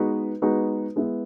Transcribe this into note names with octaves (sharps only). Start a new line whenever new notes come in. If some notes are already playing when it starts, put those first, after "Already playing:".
Already playing: G#3 B3 D#4 F#4 B4
G#3 B3 D#4 F#4 B4
G#3 B3 E4